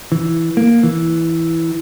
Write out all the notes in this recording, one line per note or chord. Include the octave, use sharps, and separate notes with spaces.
E3
A#3
E3